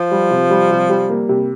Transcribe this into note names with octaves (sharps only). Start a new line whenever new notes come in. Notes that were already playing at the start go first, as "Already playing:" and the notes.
Already playing: F3
G3
C3
G3
C3
G3
A#3
C3